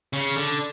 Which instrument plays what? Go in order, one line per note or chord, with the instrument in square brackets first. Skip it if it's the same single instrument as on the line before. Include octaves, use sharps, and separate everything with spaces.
[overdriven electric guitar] C#3
D3